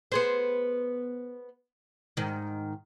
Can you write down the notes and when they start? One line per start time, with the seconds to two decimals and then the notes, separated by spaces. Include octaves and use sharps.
0.12 B3 G#4 C5
2.17 G#2 D#3